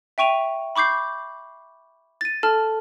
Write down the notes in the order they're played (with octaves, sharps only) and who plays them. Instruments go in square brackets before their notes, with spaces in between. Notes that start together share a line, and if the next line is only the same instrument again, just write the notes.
[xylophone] E5 G5 C#6 D#7 F7
B5 C#6 D6 G6 C7
A6 D#7
A4 A5 F6